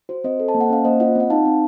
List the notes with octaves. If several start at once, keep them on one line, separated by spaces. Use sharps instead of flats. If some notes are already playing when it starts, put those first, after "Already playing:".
F#4 C5
C4 C5 D#5
A4
A5
A#3
F#5
C#4 F5
A#3 C5 D#5
F4 D#5 F#5
C4 F#5
D#4 F5 A5
C4